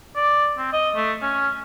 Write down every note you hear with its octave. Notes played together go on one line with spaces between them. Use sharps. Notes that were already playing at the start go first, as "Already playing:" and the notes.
D5
C4
D#5
A3
C#4